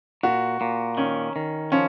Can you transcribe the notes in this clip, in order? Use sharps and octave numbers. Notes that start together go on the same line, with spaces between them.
A#2 F#4
A#2
D#3 C#4
D#3
F3 C#4